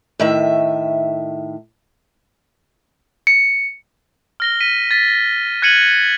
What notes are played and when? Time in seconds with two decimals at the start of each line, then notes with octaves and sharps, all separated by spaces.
0.19 A2 D#3 E5
3.27 C#7
4.40 F6 A#6 G7
4.60 B6 D#7
4.91 A6 B6
5.62 F#6 G#6 C#7 D#7 F#7